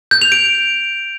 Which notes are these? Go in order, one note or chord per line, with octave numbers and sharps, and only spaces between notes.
G6
F7
D7